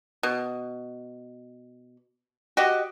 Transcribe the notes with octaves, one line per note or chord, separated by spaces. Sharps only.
B2
F#4 G4 D#5